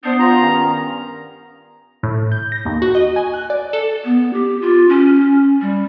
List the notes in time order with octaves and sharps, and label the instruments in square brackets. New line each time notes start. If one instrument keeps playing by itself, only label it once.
[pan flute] B3 [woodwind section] D4 C5
[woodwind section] F4 [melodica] A#5
[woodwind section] G2 D#3 C#4
[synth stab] A2
G6
A#6
D#2
F#4
D#5
G#5
F#6
D5
A4
[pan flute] B3
G4
F4
C#4
G3